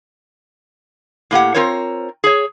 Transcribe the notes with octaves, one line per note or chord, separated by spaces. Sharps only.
A2 A#3 G4 F#5
C4 F4 A#4 C5 C#5
G#4 C#5